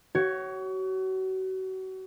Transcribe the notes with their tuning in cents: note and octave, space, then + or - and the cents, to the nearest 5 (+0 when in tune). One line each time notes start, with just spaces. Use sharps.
F#4 +35 C#5 +0